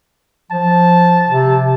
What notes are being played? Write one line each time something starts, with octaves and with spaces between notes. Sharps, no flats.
F3 A5
C3